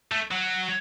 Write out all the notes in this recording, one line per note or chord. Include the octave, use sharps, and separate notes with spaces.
A3
F#3